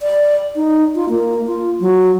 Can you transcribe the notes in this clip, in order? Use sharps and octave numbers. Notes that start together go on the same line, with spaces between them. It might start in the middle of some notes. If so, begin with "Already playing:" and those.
D5
D#4
F4
A#3
F4
F#3